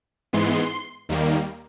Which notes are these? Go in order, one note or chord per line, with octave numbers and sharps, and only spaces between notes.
G#2 E3 G#3 B3 C6
D#2 D#3 G3 A#3